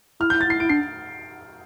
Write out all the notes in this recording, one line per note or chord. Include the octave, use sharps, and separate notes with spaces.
E4 F6
E4 G6
A6
E4 C7
E4 D7
D4 C7